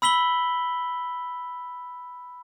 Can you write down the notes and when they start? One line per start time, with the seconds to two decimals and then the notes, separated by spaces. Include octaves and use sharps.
0.02 B5 E6 B6 F#7 G7